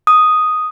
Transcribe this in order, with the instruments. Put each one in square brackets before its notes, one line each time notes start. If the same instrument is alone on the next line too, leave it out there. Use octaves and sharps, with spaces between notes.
[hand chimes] D#6